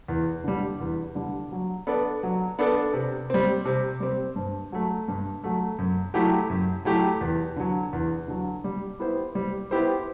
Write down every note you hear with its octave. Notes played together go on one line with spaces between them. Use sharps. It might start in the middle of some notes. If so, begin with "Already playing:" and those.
E2
D3 G3
E2
D3 G3
F#3
B3 D4 A4 D5
F#3
B3 D4 A4 D5
C3
G3 C4
C3
G3 C4
G2
F#3 A3
G2
F#3 A3
F#2
F#3 A3 E4 G4
F#2
F#3 A3 E4 G4
E2
D3 F#3
E2
D3 F#3
G3
B3 E4 G4 C5
G3
B3 E4 G4 C5